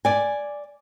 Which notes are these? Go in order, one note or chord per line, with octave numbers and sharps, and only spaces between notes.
D5 G#5